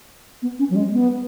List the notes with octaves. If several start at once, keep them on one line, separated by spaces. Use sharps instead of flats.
B3
C#4
F#3
G#3
B3